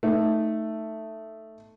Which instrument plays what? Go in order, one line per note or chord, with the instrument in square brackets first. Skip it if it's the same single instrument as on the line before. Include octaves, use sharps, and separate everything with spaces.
[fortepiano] A3 D#4